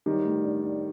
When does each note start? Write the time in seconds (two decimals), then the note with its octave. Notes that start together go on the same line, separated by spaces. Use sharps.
0.06 D#3 F#3 G3
0.25 A2
0.44 D4
0.63 D4